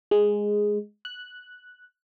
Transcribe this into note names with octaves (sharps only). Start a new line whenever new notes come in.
G#3
F#6